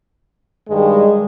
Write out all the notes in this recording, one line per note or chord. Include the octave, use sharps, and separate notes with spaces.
G2 D#3 G3 G#3